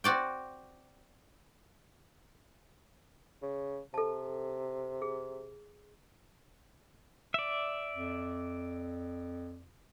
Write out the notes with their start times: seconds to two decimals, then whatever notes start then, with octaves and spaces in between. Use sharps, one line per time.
0.04 C4 F#4 D5 G5
3.42 C#3
3.94 C3 A4 A5
5.02 G#4
7.34 D5 E5
7.95 F2